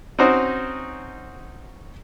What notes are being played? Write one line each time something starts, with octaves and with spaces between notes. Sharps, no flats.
C4 C#4 D#4 F#4 C5